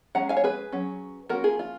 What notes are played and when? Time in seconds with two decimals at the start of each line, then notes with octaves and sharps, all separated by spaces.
0.15 G#3 C#4 F#5 A#5
0.29 F5 G#5
0.37 C#5
0.44 G#4 B4
0.72 F#3 C#4
1.29 F3 A#3 C#4 F#4 A#4
1.44 F4 G#4
1.59 F4